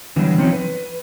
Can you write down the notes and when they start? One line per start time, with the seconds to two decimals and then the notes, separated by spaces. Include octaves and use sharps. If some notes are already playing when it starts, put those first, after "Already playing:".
0.16 D3 E3 F#3 G3 B3
0.38 F3 C4 C#4 D#4 C#5
0.52 B4